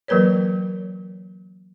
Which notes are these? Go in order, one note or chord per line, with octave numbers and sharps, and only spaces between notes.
E3 F#3 A#3 A#4 B4 C#5